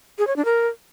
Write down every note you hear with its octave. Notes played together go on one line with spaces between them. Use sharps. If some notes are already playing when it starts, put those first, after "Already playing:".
G#4
C#5
D4
A#4